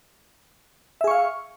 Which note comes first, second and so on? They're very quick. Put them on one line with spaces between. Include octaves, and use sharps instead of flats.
E5 G#4 C#6 F5